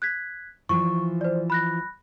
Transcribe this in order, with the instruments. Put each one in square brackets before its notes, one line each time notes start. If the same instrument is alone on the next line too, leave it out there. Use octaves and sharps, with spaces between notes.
[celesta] F#6 G#6 B6
[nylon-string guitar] E3 F3 [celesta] C#6
[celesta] C5 D5
B5 F#6 A#6